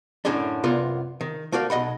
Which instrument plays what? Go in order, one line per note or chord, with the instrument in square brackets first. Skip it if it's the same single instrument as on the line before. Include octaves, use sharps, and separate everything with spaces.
[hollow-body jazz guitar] F#2 A2 D3 C#4 D4
C2 F#2 B3 F4 A#4 D5
D#3
A3 A#3 F#4 D5 F5
B1 D#5 F#5 B5